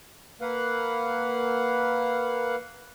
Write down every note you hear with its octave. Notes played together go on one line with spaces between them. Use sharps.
A#3 B4 F5 F#5